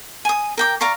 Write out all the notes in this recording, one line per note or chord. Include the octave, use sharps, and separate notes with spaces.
G#5 D#6
A#4 G5 D6
D5 F5 A#5 C#6